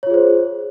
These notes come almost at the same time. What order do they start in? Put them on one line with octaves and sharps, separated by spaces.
C#5 F4 G#4 C5